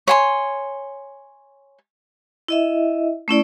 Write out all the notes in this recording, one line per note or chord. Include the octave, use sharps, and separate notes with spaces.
C#5 G#5 C6
E4 D#5 E5
A3 C#4 E4 D5